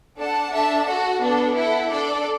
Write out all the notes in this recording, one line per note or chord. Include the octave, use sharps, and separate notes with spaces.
D4 A4 D5 F#5 A5
D4 A4 E5 A5
F#4 A4 F#5
B3 D4 A4
E4 A4 F#5
D4 A4 D5